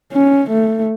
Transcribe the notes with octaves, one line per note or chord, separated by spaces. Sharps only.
C#4
A3